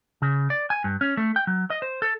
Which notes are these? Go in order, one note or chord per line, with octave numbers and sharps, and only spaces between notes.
C#3
D5
G#5
G2
C#4
A3
G5
F#3
D#5
C5
A4